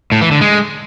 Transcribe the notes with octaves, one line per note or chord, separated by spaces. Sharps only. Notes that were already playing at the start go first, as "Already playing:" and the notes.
A2
E3
D3
G#3